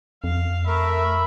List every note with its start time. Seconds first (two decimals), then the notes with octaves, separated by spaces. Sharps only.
0.24 F2 F5
0.67 A3 A#4 E5 B5